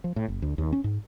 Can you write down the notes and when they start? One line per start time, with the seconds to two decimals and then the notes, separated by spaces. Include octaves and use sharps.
0.04 F3
0.16 A2
0.28 F#1
0.42 D2
0.58 D#2
0.72 C#4
0.84 G#2